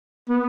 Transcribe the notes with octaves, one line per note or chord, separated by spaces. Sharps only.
B3